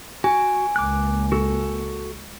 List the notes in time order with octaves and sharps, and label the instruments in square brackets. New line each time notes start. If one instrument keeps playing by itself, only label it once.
[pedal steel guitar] F#4 [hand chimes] G#5
[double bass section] C#2 A#3 [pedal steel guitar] D6 F#6
[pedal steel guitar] F#4 A4